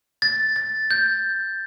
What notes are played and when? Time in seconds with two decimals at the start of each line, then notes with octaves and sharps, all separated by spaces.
0.22 A6
0.56 A6
0.91 G6